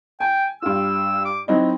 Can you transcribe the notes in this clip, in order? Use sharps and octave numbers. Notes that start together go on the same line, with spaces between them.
G5 G#5
G2 F4 E6
D6
F#3 C4 D#4 E4